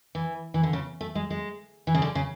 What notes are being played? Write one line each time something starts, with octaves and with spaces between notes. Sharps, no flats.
E3
E3
D3
C#3
A3
G#3
G#3
E3
C#3
D3
C#3